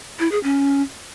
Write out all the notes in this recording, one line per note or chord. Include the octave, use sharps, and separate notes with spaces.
E4
G#4
C#4